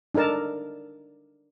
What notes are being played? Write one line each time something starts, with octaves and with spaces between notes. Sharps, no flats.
D4 D#4 A4 A#4 A5